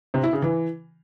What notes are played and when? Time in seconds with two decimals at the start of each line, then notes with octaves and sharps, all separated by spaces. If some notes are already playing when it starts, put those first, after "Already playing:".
0.14 C3
0.23 E4
0.33 C#3
0.42 E3